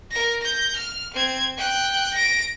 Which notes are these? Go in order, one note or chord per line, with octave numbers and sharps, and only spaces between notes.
A#4 A#6
G6 A#6
F6
C4 G#6
G5 F#6
A#6 D7